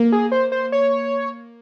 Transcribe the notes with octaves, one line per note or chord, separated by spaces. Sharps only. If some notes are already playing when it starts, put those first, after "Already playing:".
Already playing: A#3
G#4
C5
C5
C#5